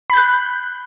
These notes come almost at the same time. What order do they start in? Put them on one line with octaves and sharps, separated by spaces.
B5 G6 F#6